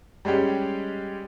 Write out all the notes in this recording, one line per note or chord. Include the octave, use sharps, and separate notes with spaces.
G3 G#3 C#4 G4